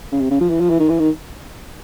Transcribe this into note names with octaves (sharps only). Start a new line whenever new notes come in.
C#3
C3
C#3
F3
E3
F3
E3
D#3
E3
D#3